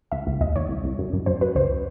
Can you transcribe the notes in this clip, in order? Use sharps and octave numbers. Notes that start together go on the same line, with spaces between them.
C#2 E5
C#2
D#2 D#5
D#2 C#5
C2
C2
F#2
F#2
F#2 C5
F#2 B4
C#2 C5